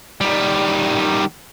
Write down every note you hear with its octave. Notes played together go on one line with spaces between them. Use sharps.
D#3 G3